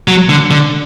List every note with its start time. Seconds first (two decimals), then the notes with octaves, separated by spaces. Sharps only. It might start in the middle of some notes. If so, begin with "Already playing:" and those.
0.08 F#3
0.29 D3
0.51 D3